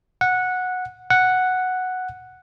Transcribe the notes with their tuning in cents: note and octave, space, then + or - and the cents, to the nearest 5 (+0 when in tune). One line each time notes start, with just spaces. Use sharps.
F#5 -10
F#5 +0